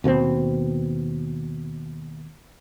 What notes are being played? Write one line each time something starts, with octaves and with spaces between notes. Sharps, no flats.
D#2 B2 A#3 C4